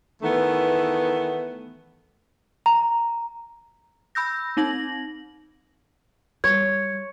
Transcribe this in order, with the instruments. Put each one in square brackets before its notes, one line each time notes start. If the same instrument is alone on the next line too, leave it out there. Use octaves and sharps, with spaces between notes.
[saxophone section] D#3 E3 A3 B3
[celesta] A#5
[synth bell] B5 E6 G6 A#6
C4 D#4 A#6 F#7
[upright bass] G3 [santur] C#5 [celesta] G#6